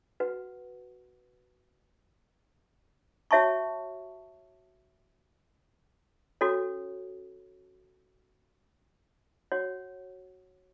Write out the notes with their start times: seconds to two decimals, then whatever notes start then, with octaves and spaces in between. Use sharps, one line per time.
0.20 F#4 B4 F#5
3.31 F#4 C#5 E5 A5 C#6
6.41 C#4 F#4 A4 C#5
9.52 F#4 C#5 F#5